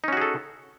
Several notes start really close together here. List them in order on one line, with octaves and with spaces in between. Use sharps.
D#4 C#4 F#4 G#4 A4